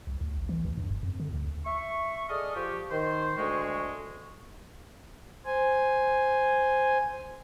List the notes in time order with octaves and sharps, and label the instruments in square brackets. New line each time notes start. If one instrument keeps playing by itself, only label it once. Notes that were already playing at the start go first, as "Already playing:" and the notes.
[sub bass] C2
D2
A1
E3
D2
G2
F1
F2
D3
D2
[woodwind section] E5 C#6
G#4 A4 D5 D#5 D#6 F6
F3 G4 C#6
D#3 C5
D2 G#3 C#6
[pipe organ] C5 G#5